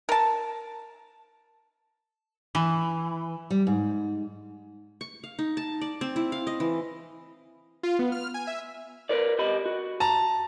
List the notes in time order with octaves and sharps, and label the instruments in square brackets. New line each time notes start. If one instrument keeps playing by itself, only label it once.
[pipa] A#4 A5
[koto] E3
[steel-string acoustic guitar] G3
G#2
[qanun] C#6
F5
D#4
A5
D5
C4
E4
F5
D#5
E3
[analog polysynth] F4
B3
F6
G#5
E5
[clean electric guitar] A#4 B4 D5
G4 D#5 B5
F#4
[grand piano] A5 A#5